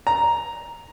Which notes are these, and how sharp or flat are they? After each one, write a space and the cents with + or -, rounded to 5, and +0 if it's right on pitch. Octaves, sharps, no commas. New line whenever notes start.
A#5 +5